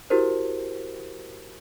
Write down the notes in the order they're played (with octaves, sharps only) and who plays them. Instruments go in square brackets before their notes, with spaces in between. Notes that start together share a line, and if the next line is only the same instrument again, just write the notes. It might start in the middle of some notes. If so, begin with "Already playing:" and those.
[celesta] E4 F#4 G4 A#4 C5